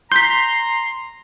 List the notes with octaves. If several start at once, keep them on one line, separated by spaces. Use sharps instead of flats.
A#5 C6 G6 B6